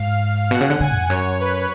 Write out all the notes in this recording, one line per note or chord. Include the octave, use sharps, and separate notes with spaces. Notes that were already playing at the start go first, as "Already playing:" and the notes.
Already playing: G#2 F5
B2 F#5
C#3
D3
D3 G#5
F2
F#2 C#5
B4